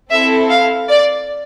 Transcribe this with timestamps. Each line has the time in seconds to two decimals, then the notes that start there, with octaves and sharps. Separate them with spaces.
0.11 C4 E4 A4 E5
0.49 F5
0.89 D5